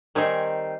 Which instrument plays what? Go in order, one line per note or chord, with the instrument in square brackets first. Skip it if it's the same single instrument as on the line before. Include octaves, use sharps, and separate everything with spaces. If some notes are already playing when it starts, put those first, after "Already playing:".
[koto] D#3 G3 C4 D#4 G#5